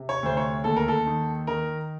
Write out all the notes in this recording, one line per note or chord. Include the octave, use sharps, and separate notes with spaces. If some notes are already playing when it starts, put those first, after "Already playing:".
Already playing: C3
C#5
D2 C5
C#5
D#2 A4
A#4
A4
D#3
D#3 A#4